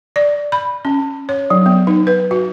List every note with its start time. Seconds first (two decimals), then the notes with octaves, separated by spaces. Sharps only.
0.16 D5
0.52 B5
0.85 C#4
1.29 C#5
1.50 F#3
1.66 B3
1.87 D#4
2.07 B4
2.31 F#4